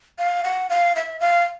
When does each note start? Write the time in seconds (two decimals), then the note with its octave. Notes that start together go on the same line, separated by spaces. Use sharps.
0.19 F5
0.44 F#5
0.70 F5
0.96 E5
1.20 F5